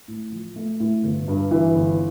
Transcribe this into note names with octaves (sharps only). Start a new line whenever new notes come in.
A2
F3
A3
A2
G1
G2
E3
G1